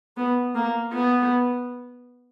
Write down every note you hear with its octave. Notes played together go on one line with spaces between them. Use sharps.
B3
A#3
B3